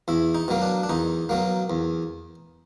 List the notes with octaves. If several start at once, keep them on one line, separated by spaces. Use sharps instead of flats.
E2 E4
D#4
B2 F#3 A#3
D4
D4
E2 D#4
B2 F#3 A#3
E2